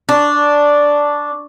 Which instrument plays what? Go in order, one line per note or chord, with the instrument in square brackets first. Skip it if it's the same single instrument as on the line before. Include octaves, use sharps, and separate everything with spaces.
[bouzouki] D4 [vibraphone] C#6 D6